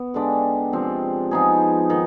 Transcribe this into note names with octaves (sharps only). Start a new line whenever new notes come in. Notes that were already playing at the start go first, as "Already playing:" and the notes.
Already playing: B3
D3 G#3 D4 G4
C3 F3 G#3 C4
F3 B3 D#4 G#4
D#3 B3